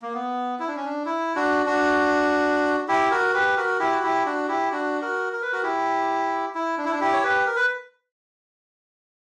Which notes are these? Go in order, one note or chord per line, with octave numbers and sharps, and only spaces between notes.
A#3
B3
E4
D4
C#4
D4
E4
D4 F#4
D4 F#4
E4 G4
F#4 A#4
G4 B4
F#4 A#4
E4 G4
F#4
E4 G4
D4 F#4
E4 G4
D4 F#4
F#4 A#4
A#4
B4
F#4 A#4
E4 G4
E4
D4
E4
D4
E4 G4
C#5
G4 B4
A#4
B4